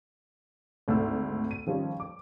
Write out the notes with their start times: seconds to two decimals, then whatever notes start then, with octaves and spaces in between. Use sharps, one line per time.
0.88 G#1 D2 G#2 A3 E6
1.51 D#7
1.67 D#3 F3 G3 C#4
2.00 D6